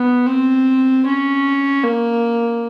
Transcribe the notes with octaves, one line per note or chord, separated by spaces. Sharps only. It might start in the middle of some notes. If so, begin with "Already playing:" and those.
Already playing: B3
C4
C#4
A#3